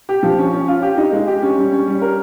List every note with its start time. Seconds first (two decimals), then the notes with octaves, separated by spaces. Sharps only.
0.09 G4
0.23 F3
0.39 C#4
0.53 C#4
0.68 F4
0.82 G4
0.97 D#4
1.12 G#3
1.27 G4
1.42 C#4
1.57 G3
1.72 C#4
1.87 G3
2.02 A#4